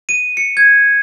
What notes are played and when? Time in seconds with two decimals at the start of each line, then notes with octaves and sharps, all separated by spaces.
0.09 D#7
0.37 C#7
0.57 G#6